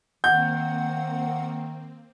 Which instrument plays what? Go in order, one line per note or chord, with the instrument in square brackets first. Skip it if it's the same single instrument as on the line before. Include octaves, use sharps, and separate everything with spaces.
[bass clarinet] D#3 [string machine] A#3 C4 [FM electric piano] F#5 [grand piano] G6